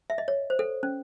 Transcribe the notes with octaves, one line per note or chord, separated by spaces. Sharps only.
E5
D#5
C#5
C5
A4
C#4